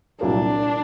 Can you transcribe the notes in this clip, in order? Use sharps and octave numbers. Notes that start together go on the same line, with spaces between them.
C2 A#2 F#3 A#3 D4